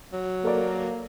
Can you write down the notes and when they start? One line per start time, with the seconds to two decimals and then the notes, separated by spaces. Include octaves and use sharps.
0.13 F#3
0.44 A#3 A4 A#4 D5